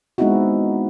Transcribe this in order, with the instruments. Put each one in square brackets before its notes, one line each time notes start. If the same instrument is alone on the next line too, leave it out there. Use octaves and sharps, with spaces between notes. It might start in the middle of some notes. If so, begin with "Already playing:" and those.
[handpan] G#3 B3 C4 D#4 E4 F#4